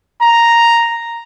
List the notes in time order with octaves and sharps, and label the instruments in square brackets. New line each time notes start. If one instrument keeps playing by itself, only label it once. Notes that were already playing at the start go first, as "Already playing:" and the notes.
[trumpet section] A#5